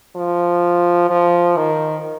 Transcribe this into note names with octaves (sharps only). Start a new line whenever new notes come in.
F3
F3
D#3